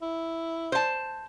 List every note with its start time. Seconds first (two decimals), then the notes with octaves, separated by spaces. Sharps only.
0.02 E4
0.72 C5 A5